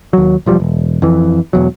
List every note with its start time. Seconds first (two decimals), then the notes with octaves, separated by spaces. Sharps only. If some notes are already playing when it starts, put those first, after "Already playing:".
0.13 D#2 F#3
0.46 E1 F3 G3
0.60 E1
1.02 F2 E3
1.53 E1 E2 F#3